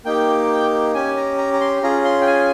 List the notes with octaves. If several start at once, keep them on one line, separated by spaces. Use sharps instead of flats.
A#3 D#4 G4 G5
C#4 G4 G#5
A#5
A#5
A#5
C6
C#4 F4 G#4 A#5
C6
G5
G#5